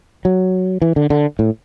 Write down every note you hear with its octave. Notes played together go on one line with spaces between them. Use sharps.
F#3
E3
D3
D3
A2